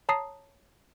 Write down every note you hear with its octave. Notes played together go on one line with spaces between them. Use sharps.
C#5 A5 A#5 D#6 C7